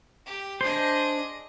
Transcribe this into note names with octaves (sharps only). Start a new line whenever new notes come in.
G4
D4 G#4 C5 D#5